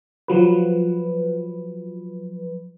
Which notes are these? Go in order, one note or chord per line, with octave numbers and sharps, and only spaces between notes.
F3 F#3 B4